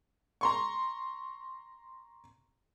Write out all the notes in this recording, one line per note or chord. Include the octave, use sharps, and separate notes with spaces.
A#5 C6 C#6